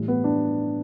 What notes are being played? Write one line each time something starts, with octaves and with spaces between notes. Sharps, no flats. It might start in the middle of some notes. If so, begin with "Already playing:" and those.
Already playing: A2 E3 G3
B3
D4